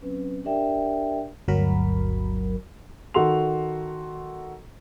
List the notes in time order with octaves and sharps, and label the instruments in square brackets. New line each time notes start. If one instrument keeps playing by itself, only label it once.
[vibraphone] F#3 C4 C#4 B4
D4 G4 A#4 D5 E5 G5
[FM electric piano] G1 D2 F#3 F#4 A#4 B5
[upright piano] D#3 F#4 A4 C6 F7